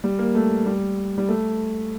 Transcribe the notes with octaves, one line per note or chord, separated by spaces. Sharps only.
G3
A#3
A3
G3
G3
A3